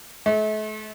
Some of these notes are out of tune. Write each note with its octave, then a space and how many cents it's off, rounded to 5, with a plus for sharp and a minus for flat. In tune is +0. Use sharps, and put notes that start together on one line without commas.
A3 -40